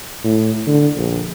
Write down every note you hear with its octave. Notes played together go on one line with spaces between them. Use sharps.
A2
D3
A#1